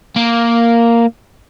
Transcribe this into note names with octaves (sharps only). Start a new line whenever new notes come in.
A#3